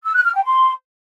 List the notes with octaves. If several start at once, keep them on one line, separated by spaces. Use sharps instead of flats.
E6
F#6
F6
G5
C6